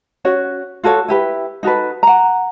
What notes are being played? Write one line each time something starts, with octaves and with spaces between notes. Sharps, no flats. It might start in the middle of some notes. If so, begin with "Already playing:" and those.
C#4 F#4 C#5
F4 F#4 A4 C#5
E4 G4 B4
D#4 F#4 A4 B4
F#5 A#5